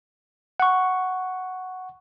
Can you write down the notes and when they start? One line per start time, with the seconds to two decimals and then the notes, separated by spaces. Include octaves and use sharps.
0.60 F#5 C#6